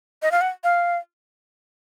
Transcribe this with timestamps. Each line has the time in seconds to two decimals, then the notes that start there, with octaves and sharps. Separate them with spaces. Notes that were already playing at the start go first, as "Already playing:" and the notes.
0.22 D#5
0.32 F5
0.41 F#5
0.64 F5